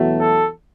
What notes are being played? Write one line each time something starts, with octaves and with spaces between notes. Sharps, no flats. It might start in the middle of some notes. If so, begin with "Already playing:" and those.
Already playing: E2 B2 F#3 A3
A4